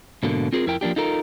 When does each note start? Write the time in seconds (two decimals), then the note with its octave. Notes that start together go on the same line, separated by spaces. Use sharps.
0.23 G#2 B2 D3 A#3
0.53 C4 F4 G#4 A#4
0.66 F2 E4 A#4 G5
0.81 F3 A#3 D4 G4
0.96 D#4 F4 A4 A#4